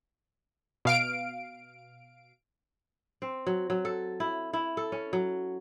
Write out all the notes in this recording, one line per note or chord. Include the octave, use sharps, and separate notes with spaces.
B2 F5 D7
C4
F#3
F#3
A4
E4
E4
A4
C#4
F#3